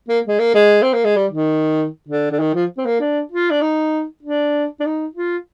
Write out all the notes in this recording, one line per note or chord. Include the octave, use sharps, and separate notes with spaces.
A#3
G#3
A#3
G#3
C4
A#3
G#3
G3
D#3
D3
D3
D#3
F3
C4
A#3
D4
F4
D4
D#4
D4
D4
D#4
F4